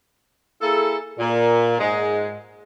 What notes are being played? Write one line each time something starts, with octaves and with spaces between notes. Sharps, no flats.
A#3 E4 G#4 A4
A#2
G#2 G#3